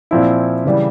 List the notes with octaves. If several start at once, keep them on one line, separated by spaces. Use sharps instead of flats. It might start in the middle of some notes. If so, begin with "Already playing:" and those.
A#2 F3 C4 E4
C#3 E3 G3